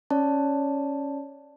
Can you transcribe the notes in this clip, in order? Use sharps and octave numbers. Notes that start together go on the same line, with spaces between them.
C#4 C#5 D5 A5